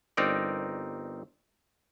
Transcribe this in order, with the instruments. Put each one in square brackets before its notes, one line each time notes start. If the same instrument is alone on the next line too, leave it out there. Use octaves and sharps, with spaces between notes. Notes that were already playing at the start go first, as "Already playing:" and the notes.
[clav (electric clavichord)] G1 C4 D#4 A#4 D5